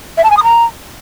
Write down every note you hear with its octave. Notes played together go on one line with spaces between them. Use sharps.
E5
A5
G#5
D#6
A#5